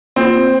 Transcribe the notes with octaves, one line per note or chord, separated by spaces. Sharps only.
A#3 C4 F4 C5